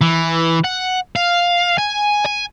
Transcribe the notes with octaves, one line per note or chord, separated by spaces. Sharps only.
E3
F#5
F5
G#5
G#5